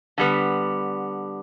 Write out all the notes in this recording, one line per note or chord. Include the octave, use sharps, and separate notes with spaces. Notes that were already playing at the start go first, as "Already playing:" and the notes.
D3 G3 B3